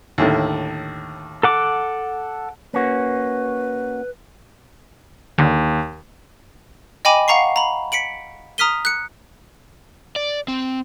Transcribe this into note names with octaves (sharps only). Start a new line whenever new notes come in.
D#2 A2 D3
A4 F#5 D6
A#3 C#4 F#4 B4
D#2 D3
D#5 G5 G#5 B5 D6 D#7
F5 F#5 A#5 C#6 C7
A#5 B5
B6 C#7 D7 F#7
A#5 D#6 F6 B6 D#7 G7
F#6 C#7
D5
C4